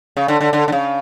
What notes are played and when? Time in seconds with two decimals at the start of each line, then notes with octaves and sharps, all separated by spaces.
0.17 C#3
0.28 D3
0.41 D3
0.53 D3
0.68 D3
0.72 C#3